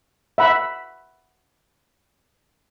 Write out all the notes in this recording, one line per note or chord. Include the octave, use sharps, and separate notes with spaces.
E5 F#5 B5